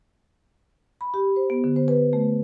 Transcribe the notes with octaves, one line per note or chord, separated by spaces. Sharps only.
B5
G4
C5
B3
D3
C5
B4
A3